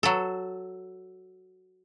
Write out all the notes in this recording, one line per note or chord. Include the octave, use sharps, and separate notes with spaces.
F#3 A4